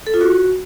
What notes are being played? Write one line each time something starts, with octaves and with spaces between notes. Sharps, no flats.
A4
F4
F#4